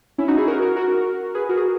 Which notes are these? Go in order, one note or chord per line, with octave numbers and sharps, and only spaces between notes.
C#4 E4
D#4 F#4
E4 G#4
F#4 A#4
F#4 A#4
F#4 A#4
G#4 B4
F#4 A#4
G#4